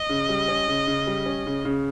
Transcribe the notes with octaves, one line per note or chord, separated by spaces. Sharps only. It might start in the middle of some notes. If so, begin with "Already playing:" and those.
Already playing: D#5
C#3
G3
C#4
C#3
C#3
G3
C#4
C#3
C#3